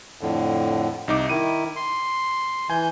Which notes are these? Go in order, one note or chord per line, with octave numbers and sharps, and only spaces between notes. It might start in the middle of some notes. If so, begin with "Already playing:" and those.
F2 A2 D3
C2 D#4 D6
D#3 E4 D#7
C6
E3 G#5 G6